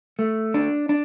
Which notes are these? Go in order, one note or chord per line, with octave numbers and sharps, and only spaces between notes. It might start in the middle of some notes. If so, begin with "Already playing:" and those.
A3
D4
D4